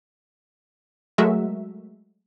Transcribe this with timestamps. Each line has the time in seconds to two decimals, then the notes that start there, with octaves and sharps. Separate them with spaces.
1.18 F#3 G#3 A3 F#4 A#4 E5